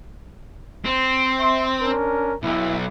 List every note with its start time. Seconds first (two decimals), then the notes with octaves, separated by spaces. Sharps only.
0.85 C4
1.40 E5 C6
1.81 C#4 D4 A#4
2.43 B1 E4